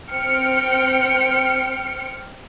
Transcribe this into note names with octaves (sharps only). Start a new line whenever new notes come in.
C4 G5 F6 C#7